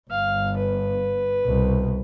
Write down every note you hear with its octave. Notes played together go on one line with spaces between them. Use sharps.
G1 F5
B4
C2 B2